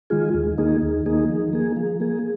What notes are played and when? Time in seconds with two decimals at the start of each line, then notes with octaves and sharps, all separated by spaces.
0.10 D#3 G#3 F4 G#4
0.34 D#2
0.57 D#3 A#3 D#4 G#4
0.82 D#2
1.06 D#3 A#3 D#4 G#4
1.29 F3
1.53 A#3 G#4
1.76 F3
2.00 A#3 G#4